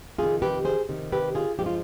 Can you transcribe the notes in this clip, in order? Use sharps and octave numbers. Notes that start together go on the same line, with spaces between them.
F2 C3 D#3 F4 G#4
G4 B4
G#4 C5
F2 C3 D#3
G4 B4
F4 G#4
G2 F3 G#3 G4
F4